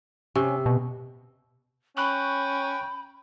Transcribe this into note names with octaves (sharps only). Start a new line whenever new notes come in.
C3 C#4
B2
C#4 G5 B5 C#6 F#6